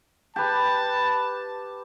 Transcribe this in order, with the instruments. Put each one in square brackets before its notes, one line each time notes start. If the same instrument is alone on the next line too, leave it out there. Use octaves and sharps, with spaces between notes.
[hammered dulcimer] G4 B4 [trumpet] A5